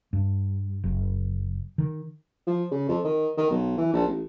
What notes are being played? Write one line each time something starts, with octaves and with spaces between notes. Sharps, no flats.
G2
F#1
D#3
F3
C#3
F2
D#3
D#3
B1
E3
A#1
A1